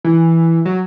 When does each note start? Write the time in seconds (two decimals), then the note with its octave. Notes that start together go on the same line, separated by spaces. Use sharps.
0.04 E3
0.65 F#3